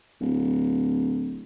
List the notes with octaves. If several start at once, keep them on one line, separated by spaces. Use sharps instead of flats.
D1